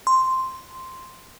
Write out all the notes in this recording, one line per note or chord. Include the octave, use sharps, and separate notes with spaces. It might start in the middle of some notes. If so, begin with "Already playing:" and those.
C6